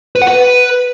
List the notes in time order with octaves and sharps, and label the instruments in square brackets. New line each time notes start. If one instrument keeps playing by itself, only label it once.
[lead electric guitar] B4
F#5
B4